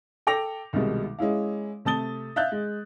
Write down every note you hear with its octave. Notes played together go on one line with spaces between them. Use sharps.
A4 G5 D6 A#6 F7
C2 B2 D#3 G3 G#3
G#3 C#4 E4 F5
C3 A3 A5 D#6 A6 G7
E5 F5 F#6 G6 A6
G#3